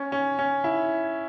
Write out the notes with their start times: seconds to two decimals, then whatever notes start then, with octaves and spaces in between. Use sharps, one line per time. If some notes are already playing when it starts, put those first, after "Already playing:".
Already playing: C#4
0.12 C#4
0.39 C#4
0.64 E4